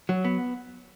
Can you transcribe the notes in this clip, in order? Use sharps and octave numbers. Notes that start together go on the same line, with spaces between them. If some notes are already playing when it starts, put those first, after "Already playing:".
F#3
B3